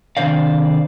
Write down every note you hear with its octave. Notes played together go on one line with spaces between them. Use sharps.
C3 D#3 D4 C5 D5 F5